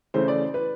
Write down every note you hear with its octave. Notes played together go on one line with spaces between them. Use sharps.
C#3 E3 A3 C5
D5
B4